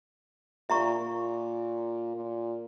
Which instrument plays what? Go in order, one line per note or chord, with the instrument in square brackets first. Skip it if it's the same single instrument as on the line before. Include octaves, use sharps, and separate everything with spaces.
[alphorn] A#2 [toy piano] E5 A#5 C#6
[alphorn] A#2
A#2